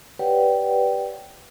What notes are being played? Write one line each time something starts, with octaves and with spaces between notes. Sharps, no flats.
G4 B4 C#5 D5 F#5 G5